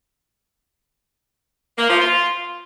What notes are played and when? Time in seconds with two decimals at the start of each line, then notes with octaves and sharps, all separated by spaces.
1.78 A#3
1.89 F3
2.00 F4